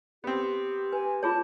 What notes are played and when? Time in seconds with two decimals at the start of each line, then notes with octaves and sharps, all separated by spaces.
0.24 B3 C4 G4
0.93 B4 G#5
1.23 F4 G#4 C#5 A5